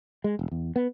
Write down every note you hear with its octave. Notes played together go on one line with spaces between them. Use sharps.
G#3
E1
E2
B3